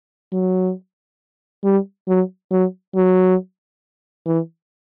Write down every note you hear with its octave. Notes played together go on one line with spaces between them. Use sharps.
F#3
G3
F#3
F#3
F#3
E3